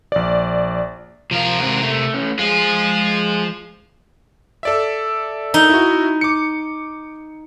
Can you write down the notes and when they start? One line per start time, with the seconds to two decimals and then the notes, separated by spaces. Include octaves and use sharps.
0.12 A#1 D5
1.31 C3 F3 F4 A#4
1.59 G#2 C4
1.82 A3
2.14 A3 C#4
2.39 F3 G#3 F4 G#4
4.63 A4 D5 E5
5.54 D#4
5.70 E4 F#4
6.21 D6 C#7